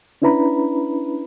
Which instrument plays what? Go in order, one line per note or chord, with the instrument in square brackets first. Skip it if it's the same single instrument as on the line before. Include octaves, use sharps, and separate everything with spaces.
[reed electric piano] C#4 D4 E4 B4 A#5 B5